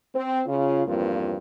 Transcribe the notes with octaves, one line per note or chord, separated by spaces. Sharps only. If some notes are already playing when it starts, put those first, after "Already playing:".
C4
C#3 F4
E2 G2 F3 A#3 C4 F4